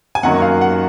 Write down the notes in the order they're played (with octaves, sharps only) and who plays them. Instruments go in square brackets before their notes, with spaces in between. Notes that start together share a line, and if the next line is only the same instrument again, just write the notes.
[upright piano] G#5
[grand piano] F#2 D#3 F#3 A#3 [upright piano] F#5
[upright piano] F5
F#5